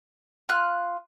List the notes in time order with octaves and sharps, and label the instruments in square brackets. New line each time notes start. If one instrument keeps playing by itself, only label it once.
[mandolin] F4 F6 F#6